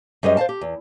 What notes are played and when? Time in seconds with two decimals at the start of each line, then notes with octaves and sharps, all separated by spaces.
0.23 F#2 G3 G#4 B4 D#5
0.37 C5 D5 F5 A5
0.49 G4
0.61 E2